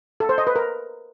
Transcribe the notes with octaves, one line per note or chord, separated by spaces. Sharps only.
A4
C5
D#5
B4
A#4